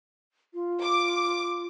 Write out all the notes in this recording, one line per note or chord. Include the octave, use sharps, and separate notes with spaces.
F4
D6